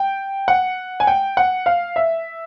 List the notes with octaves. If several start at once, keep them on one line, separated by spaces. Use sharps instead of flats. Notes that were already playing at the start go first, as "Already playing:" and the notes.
Already playing: G5
F#5
G#5
G5
F#5
F5
E5